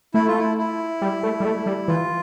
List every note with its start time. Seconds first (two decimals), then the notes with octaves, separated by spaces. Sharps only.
0.14 A3 E4
0.27 F4
0.39 E4
0.58 E4
1.02 G3
1.23 A3
1.40 G3
1.45 A3
1.66 G3
1.88 E3 F4